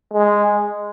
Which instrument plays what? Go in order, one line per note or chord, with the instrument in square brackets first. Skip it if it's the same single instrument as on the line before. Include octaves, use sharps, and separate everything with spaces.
[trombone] G#3